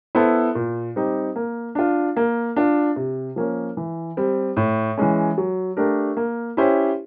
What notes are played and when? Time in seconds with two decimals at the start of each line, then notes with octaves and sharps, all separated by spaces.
0.15 B3 E4 A4 C5
0.55 A#2
0.96 G3 C4 D#4 G4
1.36 A#3
1.75 D4 F4
2.17 A#3
2.56 D4 F4
2.96 C3
3.36 F3 A#3 C#4
3.77 E3
4.17 G3 C4
4.57 A2
4.97 E3 G#3 C#4
5.38 F#3
5.77 A3 D4 G4 A#4
6.17 A#3
6.57 C#4 E4 G4 C5